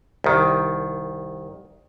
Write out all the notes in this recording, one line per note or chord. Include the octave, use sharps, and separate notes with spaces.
C2 D#3